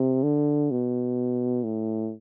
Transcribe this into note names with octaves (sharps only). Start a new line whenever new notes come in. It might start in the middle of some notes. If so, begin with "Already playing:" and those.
Already playing: C3
D3
B2
A2